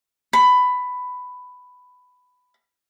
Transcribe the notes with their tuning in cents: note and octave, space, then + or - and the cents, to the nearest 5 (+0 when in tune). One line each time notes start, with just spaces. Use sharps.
B5 +10